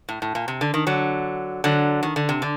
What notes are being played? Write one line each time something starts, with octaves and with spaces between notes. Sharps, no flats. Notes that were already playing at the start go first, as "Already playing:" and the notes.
A2
A2
A#2
C3
D3
D#3
D3 F#3
D3 F#3
D#3
D3
C3
D3